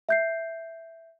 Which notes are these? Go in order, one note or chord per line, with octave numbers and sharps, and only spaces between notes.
E5 G6 C7